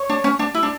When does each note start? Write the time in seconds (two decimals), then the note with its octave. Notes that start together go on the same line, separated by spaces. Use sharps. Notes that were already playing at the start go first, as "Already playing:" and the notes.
Already playing: C#5
0.09 D4
0.24 C#4
0.39 D4
0.54 E4
0.63 D4